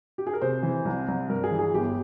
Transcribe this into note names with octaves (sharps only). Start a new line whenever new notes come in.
G4
G#4
A#4
C3 C5
E3
C2
C2
G2 A#4
G#4
E3
G#4
G1 G4